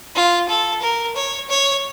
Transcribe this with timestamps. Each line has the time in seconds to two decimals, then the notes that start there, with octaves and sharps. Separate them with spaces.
0.15 F4
0.49 A4
0.82 A#4
1.15 C#5
1.50 C#5